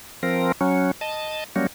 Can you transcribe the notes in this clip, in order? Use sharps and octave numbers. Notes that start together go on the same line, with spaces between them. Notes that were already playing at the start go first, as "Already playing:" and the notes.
F3 C4 A#4
F#3 C#4
D#5 A5
F#3 G3 A#3 C#4